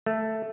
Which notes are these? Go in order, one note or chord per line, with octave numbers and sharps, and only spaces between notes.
A3